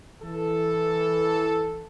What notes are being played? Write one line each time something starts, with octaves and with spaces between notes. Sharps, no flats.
E3 A4